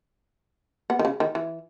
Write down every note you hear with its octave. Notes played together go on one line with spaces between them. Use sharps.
B3
D#3
C#3
D#3
E3